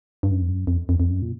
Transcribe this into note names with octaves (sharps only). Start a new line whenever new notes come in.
G2
F#2
F2
F#2
F2
F2
F2
F#2
A#2